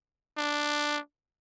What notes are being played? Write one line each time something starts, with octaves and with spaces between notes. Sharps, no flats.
D4